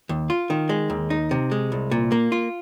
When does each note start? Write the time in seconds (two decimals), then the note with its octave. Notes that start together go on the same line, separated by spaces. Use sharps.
0.09 D#2
0.30 F4
0.50 D#3
0.69 G#3
0.90 D#2
1.10 D#4
1.31 C3
1.51 G#3
1.72 C2
1.91 A#2
2.12 A#3
2.32 F4